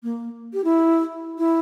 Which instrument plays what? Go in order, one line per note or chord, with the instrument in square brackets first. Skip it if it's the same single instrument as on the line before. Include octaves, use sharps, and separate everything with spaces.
[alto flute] A#3
G4
E4
E4